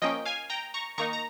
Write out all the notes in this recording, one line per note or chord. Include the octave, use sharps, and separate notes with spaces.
F3 A#3 C#4 D#5 G5
F5 G#5
G5 A#5
A#5 C#6
D#3 A#3 D#4 A#5 C#6
A#5